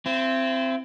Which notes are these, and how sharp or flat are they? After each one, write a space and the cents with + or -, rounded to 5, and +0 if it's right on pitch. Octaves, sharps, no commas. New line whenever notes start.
C4 -5 E4 +40